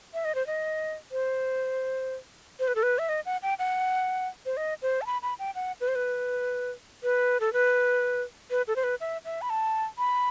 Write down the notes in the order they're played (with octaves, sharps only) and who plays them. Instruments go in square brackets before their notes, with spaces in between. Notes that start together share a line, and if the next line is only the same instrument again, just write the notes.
[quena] E5
D#5
C5
D#5
C5
C5
B4
A4
B4
E5
D#5
F#5
G5
F#5
C5
D#5
C5
A5
B5
B5
G5
F#5
B4
C5
B4
B4
A4
B4
B4
A4
C5
B4
E5
E5
B5
A5
B5